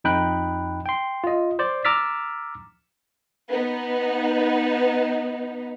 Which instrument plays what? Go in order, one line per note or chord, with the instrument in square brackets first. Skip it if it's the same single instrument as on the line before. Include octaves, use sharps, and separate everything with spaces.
[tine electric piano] F2 D#4 G5 B5 F#6
G5 C6
F4 D#5
C5 D5
A#5 D6 E6 F6 A6 B6
[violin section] B3 D#4